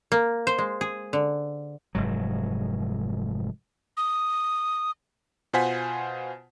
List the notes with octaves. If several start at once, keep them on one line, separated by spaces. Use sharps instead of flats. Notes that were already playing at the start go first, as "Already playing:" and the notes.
A#3
C5
G#3
G#4
D3
F1 G#2 F#3
D#6
B2 F4 C5 F#5 G#5 B6